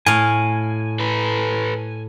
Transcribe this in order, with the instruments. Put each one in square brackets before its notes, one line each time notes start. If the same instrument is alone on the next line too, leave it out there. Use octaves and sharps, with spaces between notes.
[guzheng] A2 F5 [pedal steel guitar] G#5
[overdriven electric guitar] A4 B4